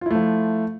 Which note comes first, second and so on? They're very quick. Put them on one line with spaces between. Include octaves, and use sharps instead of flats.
F4 E4 A3 F3